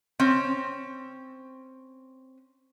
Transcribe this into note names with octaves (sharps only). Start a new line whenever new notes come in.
C4 C#4